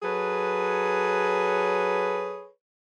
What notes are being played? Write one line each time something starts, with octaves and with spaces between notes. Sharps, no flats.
F#3 G#4 A4 B4 C#5